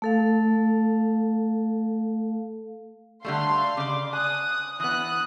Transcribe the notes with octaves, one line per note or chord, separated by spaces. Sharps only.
A3 A4 F5
D3 G3 A3 F5 C6
C#3 D5 D6
G#5 D#6 F#6
E3 B3 D#6 F#6